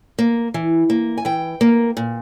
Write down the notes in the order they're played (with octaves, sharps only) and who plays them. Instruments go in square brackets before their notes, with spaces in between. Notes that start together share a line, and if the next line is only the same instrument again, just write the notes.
[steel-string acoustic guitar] A#3
E3
A#3
G#5
E3 G5
A#3
A#2